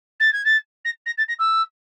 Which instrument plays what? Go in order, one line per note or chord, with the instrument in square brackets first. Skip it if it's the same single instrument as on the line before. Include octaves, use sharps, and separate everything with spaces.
[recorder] A6
G#6
A6
A#6
A#6
A6
A#6
E6